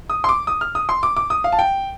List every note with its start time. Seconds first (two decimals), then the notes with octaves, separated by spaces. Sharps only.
0.10 D#6
0.24 C6
0.29 D6
0.47 D#6
0.61 F6
0.75 D#6
0.89 C6
1.03 D6
1.16 D6
1.30 D#6
1.44 F5
1.52 A5
1.59 G5